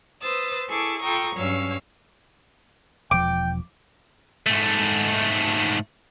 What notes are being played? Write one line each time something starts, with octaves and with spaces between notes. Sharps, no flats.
B4 C5 D#6 E6 A6
E4 G#4 A4 A5 C#6 D6
F4 A4 G5 A#5 C#6 D#6
G2 F#3 C#4 C#5 F5 E6
E1 F3 G5 D6
G#2 A3